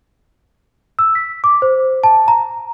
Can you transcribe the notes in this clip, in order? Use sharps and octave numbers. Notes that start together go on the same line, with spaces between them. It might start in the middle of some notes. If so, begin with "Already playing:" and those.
E6
B6
D6
C5
A5
A#5